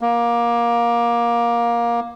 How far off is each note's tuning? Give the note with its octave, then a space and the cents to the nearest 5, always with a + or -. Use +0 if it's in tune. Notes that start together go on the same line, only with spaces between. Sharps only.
A#3 +20